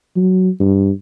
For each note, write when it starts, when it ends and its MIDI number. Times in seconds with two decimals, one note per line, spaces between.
0.16 0.49 54
0.60 0.91 43